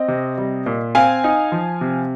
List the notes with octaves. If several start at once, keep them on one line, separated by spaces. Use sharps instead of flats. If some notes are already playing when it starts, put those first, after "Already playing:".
Already playing: C4 D#5
C3
G3
A#2
C4 F5 G#5
D#4
F3
C3